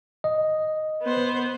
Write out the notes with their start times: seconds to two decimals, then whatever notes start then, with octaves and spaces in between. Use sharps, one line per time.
0.24 D#5
1.02 B3 C5